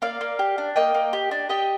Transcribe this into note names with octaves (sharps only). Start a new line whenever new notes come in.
A#3 D5 F5
A#3
G4
D4
A#3 D#5 G5
A#3
G4
D4
G4 D#5 G5